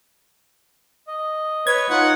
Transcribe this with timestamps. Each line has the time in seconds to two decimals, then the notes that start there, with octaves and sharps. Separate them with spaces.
1.07 D#5
1.67 B4 C#5 G#6
1.90 D#4 F4 F#5